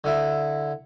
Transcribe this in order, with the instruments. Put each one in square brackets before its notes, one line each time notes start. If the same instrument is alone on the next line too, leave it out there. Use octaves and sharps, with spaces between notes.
[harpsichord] D3 E4